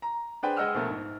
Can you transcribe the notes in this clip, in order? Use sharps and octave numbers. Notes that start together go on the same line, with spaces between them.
A#5
D4 G#4 B4 C5 G5
G#3 D#5 F#5 G5 E6 F6
A#1 B2 A3 A#4
G#2